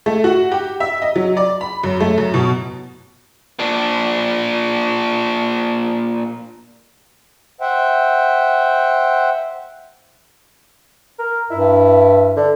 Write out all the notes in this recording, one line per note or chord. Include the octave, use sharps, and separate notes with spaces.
A3
F#4
G4
E5
D#5
F#3
D5
B5
F#2
A3
F#2
B2
A#2 D4
C5 E5 F#5 G5
A#4
G2 E4
D3